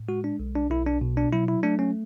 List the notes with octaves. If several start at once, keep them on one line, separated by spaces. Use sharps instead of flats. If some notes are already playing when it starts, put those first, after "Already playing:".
Already playing: A2
G#3 F#4
D4
B1
D4
B1 E4
D4
B2
D4
F#3 E4
E4
A3 D4
C#4